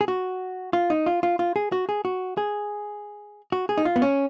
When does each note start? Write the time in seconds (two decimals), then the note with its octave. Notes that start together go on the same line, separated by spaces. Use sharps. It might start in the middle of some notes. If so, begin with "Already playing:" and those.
0.01 G#4
0.08 F#4
0.73 F4
0.90 D#4
1.06 F4
1.23 F4
1.39 F4
1.56 G#4
1.72 F#4
1.89 G#4
2.05 F#4
2.37 G#4
3.52 F#4
3.69 G#4
3.78 D#4
3.85 F4
3.96 B3
4.02 C#4